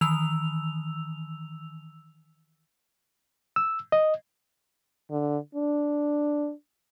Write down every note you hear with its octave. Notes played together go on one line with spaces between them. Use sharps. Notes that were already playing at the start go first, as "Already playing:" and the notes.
D#3 E3 E6 F7
E6
D#5
D3
D4